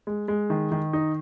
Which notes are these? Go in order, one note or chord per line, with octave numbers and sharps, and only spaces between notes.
G#3
G#3
D#3
D#3
D#4